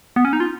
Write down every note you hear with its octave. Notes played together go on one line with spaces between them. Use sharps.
B3
C#4
D#4
F4